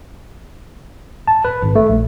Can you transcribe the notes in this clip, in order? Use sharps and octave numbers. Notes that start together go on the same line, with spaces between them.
A5
B4
G#1
A3
A#1